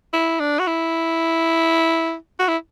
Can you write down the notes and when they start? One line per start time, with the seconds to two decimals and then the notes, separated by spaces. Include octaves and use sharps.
0.13 E4
0.40 D4
0.59 F#4
0.67 E4
2.39 F#4
2.48 E4